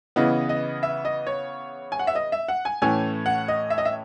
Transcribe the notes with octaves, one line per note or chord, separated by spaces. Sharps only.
C#3 E3 B3 D#5
D#5
E5
D#5
C#5
G#5
F#5
E5
D#5
E5
F#5
G#5
A2 E3 A3 C#4 G#5
F#5
D#5
E5
D#5
E5